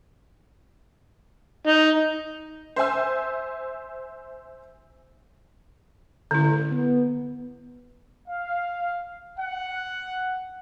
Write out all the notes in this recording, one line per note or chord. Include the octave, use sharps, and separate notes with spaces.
D#4
C5 E5 G#5 E6
A1 D3 E4
B3
F5
F#5